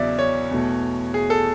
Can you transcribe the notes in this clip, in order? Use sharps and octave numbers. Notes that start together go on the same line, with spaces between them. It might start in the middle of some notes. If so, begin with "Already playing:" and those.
Already playing: E2 C#3 F#3 D5 E5
C#5
E2 B2 A3
G#4
A4